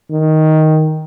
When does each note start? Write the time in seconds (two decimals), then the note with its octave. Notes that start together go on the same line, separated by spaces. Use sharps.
0.11 D#3